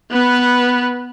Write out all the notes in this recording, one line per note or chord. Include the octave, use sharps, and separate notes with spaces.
B3 B4